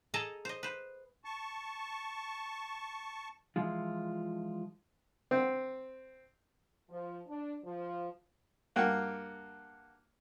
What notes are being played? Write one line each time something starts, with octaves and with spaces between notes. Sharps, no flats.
G#4 A4 D#5 A5 A#5
C5 D#5
B4 C5
A5 C#6
E3 F3 G#3 F4
C4
F3
D4
F3
G2 A#3 F#4 G5